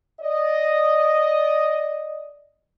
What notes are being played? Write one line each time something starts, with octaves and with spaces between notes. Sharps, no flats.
D5 D#5